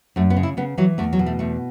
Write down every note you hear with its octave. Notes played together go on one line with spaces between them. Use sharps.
F#2 A3
B3
C#3
E4
C#3 B3
E3 F#3
E2 A3
F#3
B2
A3
E2 A3